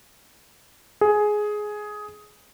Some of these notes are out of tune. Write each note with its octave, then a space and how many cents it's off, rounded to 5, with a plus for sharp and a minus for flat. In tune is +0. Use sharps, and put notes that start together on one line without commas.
G#4 +10